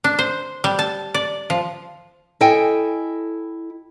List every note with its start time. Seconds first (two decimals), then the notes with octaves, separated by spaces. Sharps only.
0.04 D4
0.19 C5
0.64 G3
0.79 A5
1.14 D5
1.50 F3
2.41 E4 A4 D#5 G5 G#5